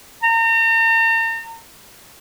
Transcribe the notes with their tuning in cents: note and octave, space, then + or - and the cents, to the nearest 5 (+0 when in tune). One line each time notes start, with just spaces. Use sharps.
A#5 -40